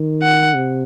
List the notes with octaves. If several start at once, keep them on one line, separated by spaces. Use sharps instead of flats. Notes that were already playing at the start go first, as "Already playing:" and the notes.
Already playing: D#3
F#5
C3